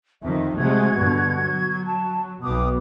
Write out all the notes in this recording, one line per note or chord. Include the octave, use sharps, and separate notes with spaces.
F2 D#3 D#5 E5
C3 G#3 A3 F#4 G#6
G2 B2 D3
F#3
A5
B1 B2 G5 D6 D#6